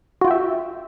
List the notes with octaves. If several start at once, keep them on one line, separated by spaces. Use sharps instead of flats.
F4 F#4 E5 G5